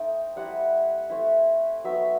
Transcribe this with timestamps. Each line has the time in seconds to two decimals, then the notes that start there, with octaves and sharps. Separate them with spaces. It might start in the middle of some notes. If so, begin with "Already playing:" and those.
Already playing: A3 C4 D#4 G5
0.36 G3 C4 E4 F#5
1.10 A3 C4 E4
1.84 F#3 B3 D#4 E5